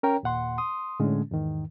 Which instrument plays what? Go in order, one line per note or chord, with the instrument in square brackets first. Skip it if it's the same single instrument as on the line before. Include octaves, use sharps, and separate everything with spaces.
[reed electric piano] C#4 A#4 C#5 G5 A#5
D#2 A#2 F#5 C6
C6 D#6
A2 D3 G#3 C#4
E2 G#2 D#3